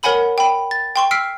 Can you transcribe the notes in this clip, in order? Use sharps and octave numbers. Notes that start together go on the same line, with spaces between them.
A#4 C#5 F#5 G#5 B5 F#7
G5 B5
A6
G5 C6 C#6
E6 F6 B6 C7 D7